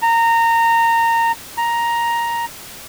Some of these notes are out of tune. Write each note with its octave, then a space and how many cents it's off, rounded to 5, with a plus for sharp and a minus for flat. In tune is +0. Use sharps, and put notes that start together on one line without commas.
A#5 -20
A#5 +5